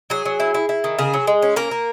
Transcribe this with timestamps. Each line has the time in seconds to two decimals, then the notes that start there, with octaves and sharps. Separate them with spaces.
0.10 F#3 G#4
0.25 F#3
0.40 E4
0.54 E4
0.69 E4
0.84 D#3
0.99 C#3 G#4
1.14 F#3
1.27 G#3
1.42 C#4
1.56 A#3 A#4
1.71 A#3